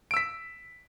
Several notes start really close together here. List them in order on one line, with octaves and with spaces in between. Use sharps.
D7 E6 B6